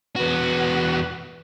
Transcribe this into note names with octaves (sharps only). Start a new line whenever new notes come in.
E2 F#4 B4